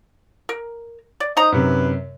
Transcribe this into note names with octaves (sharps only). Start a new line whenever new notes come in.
A#4
D5
D#4 C5 D#5 A#5
F#2 C3 B4